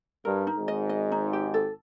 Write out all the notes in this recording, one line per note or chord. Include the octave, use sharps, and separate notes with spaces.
G2 A#4
D#4
G#1 G#2
D#5
D#5
D#4
G4
A4